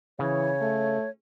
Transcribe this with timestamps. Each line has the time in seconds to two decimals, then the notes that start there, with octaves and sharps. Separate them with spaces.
0.19 C#3 E3 C#5
0.61 A3